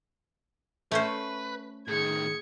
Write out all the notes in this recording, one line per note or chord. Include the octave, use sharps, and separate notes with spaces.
A3 C#4 B4 C5
A2 D#3 G#4 G#6 C#7